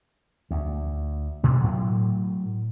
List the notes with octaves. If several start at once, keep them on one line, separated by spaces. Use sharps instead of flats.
D2
A1 B2 D3 D4
A2 F#3